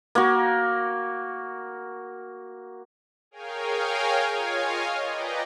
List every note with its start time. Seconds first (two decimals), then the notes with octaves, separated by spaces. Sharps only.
0.15 A#3 F#4
3.31 G#4 A#4 C#5 F5 G5 G#5
4.34 F4 C#5 D#5 F5 G#5
5.04 B4 D5 D#5 G5 A#5